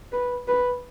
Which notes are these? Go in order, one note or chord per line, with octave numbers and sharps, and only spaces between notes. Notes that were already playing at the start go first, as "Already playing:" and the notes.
B4
B4